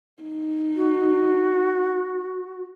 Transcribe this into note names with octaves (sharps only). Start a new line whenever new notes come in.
D#4
F#4